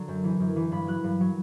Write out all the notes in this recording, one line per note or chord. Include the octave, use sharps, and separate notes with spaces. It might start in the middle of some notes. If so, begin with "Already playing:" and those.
Already playing: D3 F#3 A#5
F#2
E3
F#2
E3
G2 B5
F#3 F#6
G2
F#3